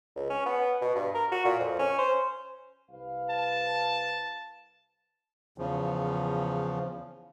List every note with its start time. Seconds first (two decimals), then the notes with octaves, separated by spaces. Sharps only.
0.16 C#2
0.30 C#4
0.46 B3
0.82 B2
0.96 G2
1.14 A#4
1.32 F#4
1.45 A#2
1.60 F2
1.79 C#4
1.99 C5
2.90 C2 B4 F5
3.30 A5
5.58 E2 C#3 F3